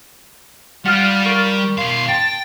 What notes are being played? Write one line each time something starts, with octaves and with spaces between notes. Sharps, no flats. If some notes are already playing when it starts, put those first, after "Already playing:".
G3 F4 F#5 F6 F#6
A#4 C#6
B2 F5 C6
G5 A5